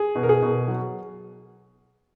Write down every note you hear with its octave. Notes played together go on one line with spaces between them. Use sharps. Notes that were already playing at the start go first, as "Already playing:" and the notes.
Already playing: G#4
B2
A#4
G#4
B2
F#3